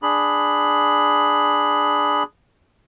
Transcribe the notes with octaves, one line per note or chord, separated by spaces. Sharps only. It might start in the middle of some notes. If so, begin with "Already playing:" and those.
D4 G#4 B5